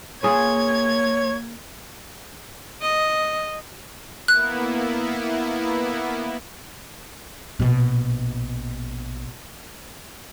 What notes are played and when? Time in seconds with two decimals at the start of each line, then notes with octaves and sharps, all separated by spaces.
0.23 A#3 F4 G#4 B4 C#5 G#6
2.82 D#5
4.28 A#3 B3 E4 F#6
7.60 A#1 B2